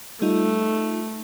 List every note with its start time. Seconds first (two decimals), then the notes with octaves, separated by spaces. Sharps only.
0.22 G3 A3 D#4 F4